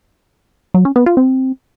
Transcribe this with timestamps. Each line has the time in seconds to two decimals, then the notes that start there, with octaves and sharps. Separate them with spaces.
0.74 F#3
0.85 C#4
0.96 B3
1.06 F4
1.17 C4